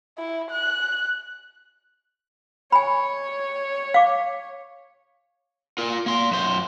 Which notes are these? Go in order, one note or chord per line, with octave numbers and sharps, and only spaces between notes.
E4
F#6
C#5 G#5 B5
F5 D6
F4 A#4
A#3 C6
F#2 C5